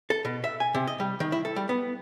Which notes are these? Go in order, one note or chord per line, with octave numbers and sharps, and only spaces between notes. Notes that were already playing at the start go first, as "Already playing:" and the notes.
A4
B2
E5
G#5
C3
D#5
G3
D#3
E4
A4
G3
B3